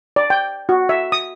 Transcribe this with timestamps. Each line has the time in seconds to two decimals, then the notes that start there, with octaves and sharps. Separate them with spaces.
0.16 D5
0.30 G5
0.69 F#4
0.89 E5
1.12 D#6